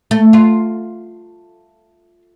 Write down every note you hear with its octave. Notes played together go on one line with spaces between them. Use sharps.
A3
F4